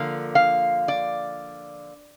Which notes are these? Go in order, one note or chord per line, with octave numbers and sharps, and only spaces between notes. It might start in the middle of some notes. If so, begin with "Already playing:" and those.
Already playing: D3 F3 A#3 F5
F5
D5